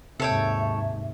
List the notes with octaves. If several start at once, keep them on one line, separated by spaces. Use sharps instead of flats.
D#2 G#2 C3 A4 C#5 E5 G5